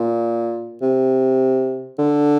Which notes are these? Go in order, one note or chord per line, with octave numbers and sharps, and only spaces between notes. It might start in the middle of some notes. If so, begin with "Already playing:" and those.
Already playing: A#2
C3
D3